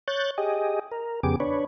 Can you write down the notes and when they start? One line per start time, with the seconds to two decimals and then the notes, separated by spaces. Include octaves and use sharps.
0.08 C#5 F#6 G6 A6
0.38 G4 G#4 D#5
0.92 A#4
1.23 F2 C#3 B3 G4 G#4 D6
1.40 D4 B4 C#5